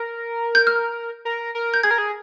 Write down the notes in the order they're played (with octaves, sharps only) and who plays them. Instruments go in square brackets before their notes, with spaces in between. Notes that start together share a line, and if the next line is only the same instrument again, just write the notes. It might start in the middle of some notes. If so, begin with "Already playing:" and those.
Already playing: [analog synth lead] A#4
[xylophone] G6
F6
[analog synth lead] A#4
A#4
[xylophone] G6
[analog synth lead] G#4 [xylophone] G#6
[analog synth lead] A#4
G#4